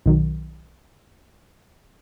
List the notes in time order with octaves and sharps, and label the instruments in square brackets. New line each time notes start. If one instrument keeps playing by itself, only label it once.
[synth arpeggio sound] B1 D#3 F#3